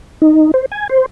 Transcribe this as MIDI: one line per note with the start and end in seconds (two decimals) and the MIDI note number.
0.22 0.51 63
0.54 0.65 72
0.72 0.87 80
0.89 1.06 72